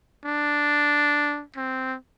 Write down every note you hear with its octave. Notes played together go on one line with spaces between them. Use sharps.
D4
C4